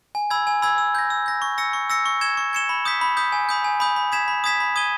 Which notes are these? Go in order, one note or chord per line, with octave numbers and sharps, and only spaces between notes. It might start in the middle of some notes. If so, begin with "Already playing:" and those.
G#5
B5 E6 G#6
G#5
B5 E6 G#6
E6
G6 A#6
E6
G6 A#6
C#6
E6 A#6 C#7
C#6
E6 A#6 C#7
C#6
G#6 C#7 E7 G7
C#6
G#6 C#7 E7 G7
B5
D#6 G6 B6
B5
D#6 G6 B6
G#5
B5 D#6 G6
G#5
B5 D#6 G6
B5
D#6 G#6 B6 E7
B5
D#6 G#6 B6 E7
B5
D#6 G#6 D#7 G7